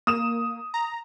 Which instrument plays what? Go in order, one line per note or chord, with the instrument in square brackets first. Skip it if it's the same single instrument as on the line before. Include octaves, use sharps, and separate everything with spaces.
[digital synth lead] A#3 [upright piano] D#6 E7
[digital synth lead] A#5